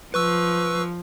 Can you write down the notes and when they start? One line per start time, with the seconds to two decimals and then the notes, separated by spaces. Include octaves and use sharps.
0.14 F3 B4 C#6 E6